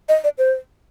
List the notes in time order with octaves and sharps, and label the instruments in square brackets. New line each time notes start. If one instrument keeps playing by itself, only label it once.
[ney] D#5
D5
C5